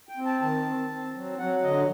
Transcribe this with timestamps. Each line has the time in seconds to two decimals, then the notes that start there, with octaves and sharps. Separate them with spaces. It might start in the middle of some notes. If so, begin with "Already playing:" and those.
0.09 G5
0.17 C4
0.26 A5
0.42 D#3 A5
0.66 C4
0.90 C4
1.15 F#3
1.39 F#3 F#5
1.63 D3 D#5